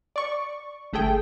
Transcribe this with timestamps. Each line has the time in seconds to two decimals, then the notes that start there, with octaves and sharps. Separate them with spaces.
0.16 D5 C#6
0.93 G1 A3 G#4 A4 G5